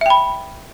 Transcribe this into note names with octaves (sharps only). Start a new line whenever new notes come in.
E5 G5 B5